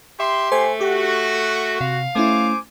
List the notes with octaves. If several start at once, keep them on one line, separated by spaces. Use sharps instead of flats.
G4 E5 C6
A3 C5 G#5
F#4 G4
C3 F5
A3 C#4 E4 C5 G#5 D6